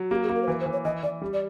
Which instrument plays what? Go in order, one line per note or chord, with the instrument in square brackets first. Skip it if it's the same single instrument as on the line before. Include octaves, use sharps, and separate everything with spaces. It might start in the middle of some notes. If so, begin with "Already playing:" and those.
Already playing: [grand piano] F#3
[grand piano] A#3 [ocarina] G4
[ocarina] G#4
[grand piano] A#3
[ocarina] A#4
C5
[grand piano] E3 [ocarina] B4
[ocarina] C5
[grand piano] E3
[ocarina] C#5
[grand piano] E3 [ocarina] D#5
[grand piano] E3 [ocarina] D5
[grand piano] G3
[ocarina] D5